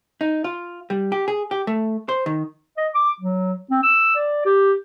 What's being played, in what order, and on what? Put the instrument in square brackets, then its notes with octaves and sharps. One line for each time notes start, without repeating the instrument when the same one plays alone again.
[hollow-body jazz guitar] D#4
F4
G3
G4
G#4
G4
A3
C5
D#3
[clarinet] D#5
D6
F#3
C4
E6
D5
G4